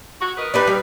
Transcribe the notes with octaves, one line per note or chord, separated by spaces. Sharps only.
F#4
A#4 B4 D#5
D4 D#4 G4 B4
G3